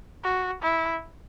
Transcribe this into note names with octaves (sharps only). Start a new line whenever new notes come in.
F#4
E4